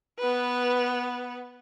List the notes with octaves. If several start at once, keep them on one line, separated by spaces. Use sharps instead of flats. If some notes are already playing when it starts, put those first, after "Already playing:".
B3 B4